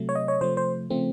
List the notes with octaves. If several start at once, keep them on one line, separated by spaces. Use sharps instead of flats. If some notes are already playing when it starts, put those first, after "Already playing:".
Already playing: C3 F#3 A3
C#5
D#5
C#5
C3 F3 A3 C5
C5
C#3 F3 A3 C4